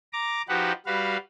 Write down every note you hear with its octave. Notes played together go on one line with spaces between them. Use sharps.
A#5 D6
F3 D#4 F#4 G4 B4 F#5
G3 F#4 B4 F5